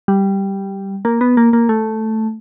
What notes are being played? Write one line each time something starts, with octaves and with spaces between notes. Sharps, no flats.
G3
A#3
B3
A#3
A#3
A3